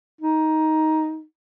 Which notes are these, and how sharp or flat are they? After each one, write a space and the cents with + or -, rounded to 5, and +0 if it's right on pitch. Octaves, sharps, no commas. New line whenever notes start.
D#4 +10